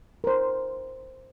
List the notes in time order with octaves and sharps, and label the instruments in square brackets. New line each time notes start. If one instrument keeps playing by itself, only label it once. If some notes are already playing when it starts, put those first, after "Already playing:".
[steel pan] A#4 C5